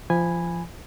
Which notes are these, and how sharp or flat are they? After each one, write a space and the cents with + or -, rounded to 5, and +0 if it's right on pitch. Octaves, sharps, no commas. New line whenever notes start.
F3 -20 G#5 -10 B5 +0